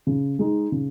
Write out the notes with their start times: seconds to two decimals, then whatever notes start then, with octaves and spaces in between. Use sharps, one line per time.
0.07 C#3
0.39 G#3 D#4
0.72 C#3